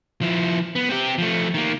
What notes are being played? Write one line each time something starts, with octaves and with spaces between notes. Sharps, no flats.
F3 E4
B3
C4 G4
F3 A3
D#3 A#3